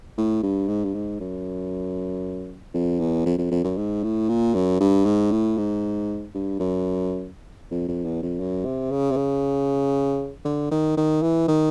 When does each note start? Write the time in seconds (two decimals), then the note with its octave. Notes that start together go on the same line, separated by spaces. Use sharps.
0.17 A2
0.43 G2
0.68 G#2
0.84 G2
0.94 G#2
1.20 F#2
2.74 F2
3.00 E2
3.26 F2
3.38 F2
3.51 F2
3.64 F#2
3.77 G#2
4.03 A2
4.29 A#2
4.54 F#2
4.80 G2
5.05 G#2
5.31 A2
5.57 G#2
6.35 G2
6.60 F#2
7.71 F2
7.88 F2
8.05 E2
8.23 F2
8.40 F#2
8.65 C3
8.91 C#3
9.11 C3
9.16 C#3
10.45 D3
10.71 D#3
10.97 D#3
11.22 E3
11.48 D#3